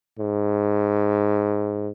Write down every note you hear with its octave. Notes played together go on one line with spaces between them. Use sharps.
G#2